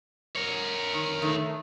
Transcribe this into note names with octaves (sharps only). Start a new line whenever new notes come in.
A#4 C#5
D#3
D#3 A3